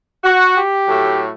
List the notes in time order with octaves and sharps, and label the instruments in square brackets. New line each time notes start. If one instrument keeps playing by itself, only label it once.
[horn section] F#4
G4
A2 F#3 A3